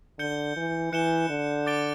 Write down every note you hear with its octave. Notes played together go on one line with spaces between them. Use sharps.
D3 G6 C#7 G7
E3
E3 F#6 C#7 E7 G7
D3
D6 A6 D7 G7